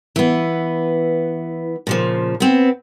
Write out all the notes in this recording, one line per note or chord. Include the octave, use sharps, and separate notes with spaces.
E3 B3
A#2 C#3 F3
B3 C4